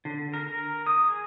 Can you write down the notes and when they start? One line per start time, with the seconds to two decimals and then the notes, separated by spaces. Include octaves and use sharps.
0.05 D3
0.34 A#4
0.46 A#4
0.87 D#6
1.08 G#4